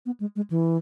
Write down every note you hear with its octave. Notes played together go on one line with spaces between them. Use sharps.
B3
G#3
G#3
E3